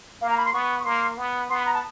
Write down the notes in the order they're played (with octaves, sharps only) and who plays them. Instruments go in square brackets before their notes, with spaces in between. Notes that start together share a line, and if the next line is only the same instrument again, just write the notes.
[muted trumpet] A#3 [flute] F5
[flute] A#5
B5
C6
[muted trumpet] B3 [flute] C#6
[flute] C#6
[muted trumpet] A#3 [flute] C6
[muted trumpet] B3
[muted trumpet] B3 [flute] C6
[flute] B5
A#5
A5